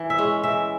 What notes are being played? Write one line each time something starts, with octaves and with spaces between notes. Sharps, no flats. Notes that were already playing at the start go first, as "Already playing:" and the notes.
Already playing: E3
E5
G#3 C#4
E3 E5